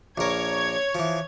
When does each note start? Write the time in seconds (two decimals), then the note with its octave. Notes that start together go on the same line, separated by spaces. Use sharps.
0.18 A#1 A#4 C#5 G#6
0.95 E3 F3